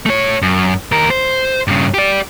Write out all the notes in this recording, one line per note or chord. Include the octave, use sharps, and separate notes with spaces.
A3 C#5
F#2
D#2 A#4
C5
G2 C#3
G4 D5